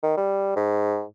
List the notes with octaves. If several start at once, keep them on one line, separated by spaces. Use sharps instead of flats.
D#3
G3
G#2